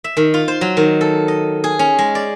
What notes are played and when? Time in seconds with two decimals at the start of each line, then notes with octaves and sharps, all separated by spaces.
0.04 E5
0.17 D#3
0.34 F4
0.48 C5
0.61 F#3
0.77 D#3
1.01 A4
1.28 D#5
1.64 G#4
1.79 C#4
1.99 G#3
2.15 D5